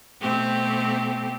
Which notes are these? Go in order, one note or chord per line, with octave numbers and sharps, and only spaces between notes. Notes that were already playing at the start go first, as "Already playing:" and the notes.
B2 A3 C4 G4